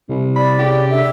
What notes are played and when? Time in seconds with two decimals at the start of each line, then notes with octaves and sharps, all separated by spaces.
0.09 C2 C3
0.36 D5 B5
0.59 C#3 G4
0.91 D3 E5